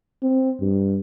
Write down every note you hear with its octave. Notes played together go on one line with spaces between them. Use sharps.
C4
G2